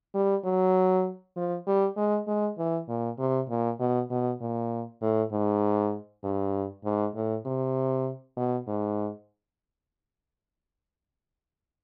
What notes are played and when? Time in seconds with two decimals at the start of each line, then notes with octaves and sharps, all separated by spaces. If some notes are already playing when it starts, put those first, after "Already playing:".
0.15 G3
0.44 F#3
1.36 F3
1.67 G3
1.97 G#3
2.27 G#3
2.58 E3
2.89 A#2
3.19 C3
3.50 A#2
3.80 B2
4.11 B2
4.41 A#2
5.02 A2
5.32 G#2
6.24 G2
6.85 G#2
7.15 A2
7.46 C3
8.37 B2
8.67 G#2